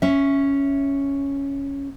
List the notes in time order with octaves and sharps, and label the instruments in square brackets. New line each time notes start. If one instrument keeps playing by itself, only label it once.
[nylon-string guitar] C#4 E5